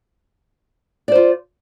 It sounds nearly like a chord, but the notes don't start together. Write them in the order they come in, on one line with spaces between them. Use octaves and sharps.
D5 C5 F4